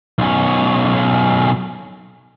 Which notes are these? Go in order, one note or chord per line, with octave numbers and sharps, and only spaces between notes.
B1 C#4